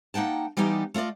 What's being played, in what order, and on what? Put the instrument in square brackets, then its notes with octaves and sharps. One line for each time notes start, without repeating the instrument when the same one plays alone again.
[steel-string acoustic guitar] A#3 D#4 F#5 G5 A5
E3 G3 B3 D#4 G4 D5
A3 F4 B4 D5 D#5